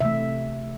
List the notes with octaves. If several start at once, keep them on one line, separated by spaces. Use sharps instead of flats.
C3 E3 A3 E5